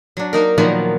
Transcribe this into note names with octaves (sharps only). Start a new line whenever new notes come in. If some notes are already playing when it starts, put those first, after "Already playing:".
F#3 D4
A#3 D#4 A#4
A#2 D#3 F3 F#3 A#3 B3